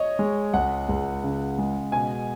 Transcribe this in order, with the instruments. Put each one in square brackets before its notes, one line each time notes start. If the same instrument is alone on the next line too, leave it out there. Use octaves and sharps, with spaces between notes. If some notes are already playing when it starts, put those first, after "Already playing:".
Already playing: [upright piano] C#5 D#5
[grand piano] G#3
[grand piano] C#2 [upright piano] F#5
[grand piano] C#2
C#3
G#3
[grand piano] B2 [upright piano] G#5